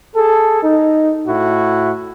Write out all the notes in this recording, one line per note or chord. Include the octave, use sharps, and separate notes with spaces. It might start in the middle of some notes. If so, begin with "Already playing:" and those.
G#4 A4
D#4
A2 E4 F#4